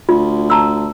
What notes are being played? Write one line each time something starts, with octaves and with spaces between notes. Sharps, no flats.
D2 F4
A5 A#5 E6